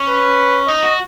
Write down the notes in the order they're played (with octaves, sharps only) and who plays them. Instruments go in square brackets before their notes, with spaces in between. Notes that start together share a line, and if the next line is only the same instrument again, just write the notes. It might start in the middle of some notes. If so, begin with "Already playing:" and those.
Already playing: [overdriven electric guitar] C#4
[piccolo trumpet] B4
[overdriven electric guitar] D#4 [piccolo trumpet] D#5
[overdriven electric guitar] F#4